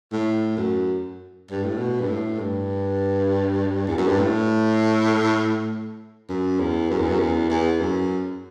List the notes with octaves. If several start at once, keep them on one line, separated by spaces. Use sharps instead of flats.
A2
F#2
G2
A2
B2
G2
A2
G2
E2
F#2
G2
A2
F#2
E2
F#2
E2
F#2
E2
E2
F#2